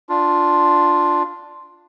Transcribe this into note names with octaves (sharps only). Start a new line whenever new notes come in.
D4 F4